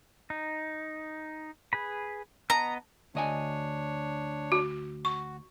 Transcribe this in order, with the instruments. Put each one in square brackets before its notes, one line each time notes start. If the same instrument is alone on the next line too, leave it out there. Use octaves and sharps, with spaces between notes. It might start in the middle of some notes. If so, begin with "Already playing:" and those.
[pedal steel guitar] D#4
G#4 B4 B5
[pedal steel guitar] B3 D#5 [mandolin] A#5
[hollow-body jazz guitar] D2 D#5 G#5 [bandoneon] D4 C#5
[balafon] F#4
[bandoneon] F#4 [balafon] C#6